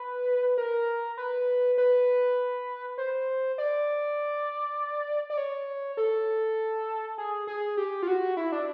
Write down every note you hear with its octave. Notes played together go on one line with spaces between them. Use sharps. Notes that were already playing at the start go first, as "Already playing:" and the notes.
Already playing: B4
A#4
B4
B4
C5
D5
D5
C#5
A4
G#4
G#4
G4
F4
F#4
E4
D4